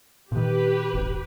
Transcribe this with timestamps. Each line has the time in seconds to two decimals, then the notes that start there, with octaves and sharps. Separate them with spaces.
0.32 A#2 D#3 G4 B4
0.94 D#1 G#1